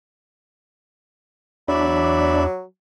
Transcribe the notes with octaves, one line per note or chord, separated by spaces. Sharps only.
E2 F#3 D4 D5 E5 B5